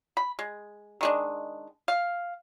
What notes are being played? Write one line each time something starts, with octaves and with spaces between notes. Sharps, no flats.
B5
G#3
D#3 G#3 D4
F5